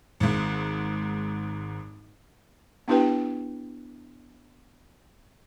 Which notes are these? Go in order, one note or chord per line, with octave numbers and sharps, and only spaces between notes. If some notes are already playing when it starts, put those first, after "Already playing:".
G#1 G#2
B3 D4 E4 G4 B4 G5